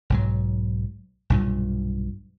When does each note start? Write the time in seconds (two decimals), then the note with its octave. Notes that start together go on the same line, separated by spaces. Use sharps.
0.10 B1 G#2 F#3
1.30 B1 G2 A#2